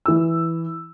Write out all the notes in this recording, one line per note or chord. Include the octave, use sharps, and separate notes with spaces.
E3 E6